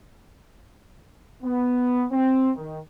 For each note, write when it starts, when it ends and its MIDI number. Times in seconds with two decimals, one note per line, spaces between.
1.43 2.05 59
2.11 2.49 60
2.56 2.78 51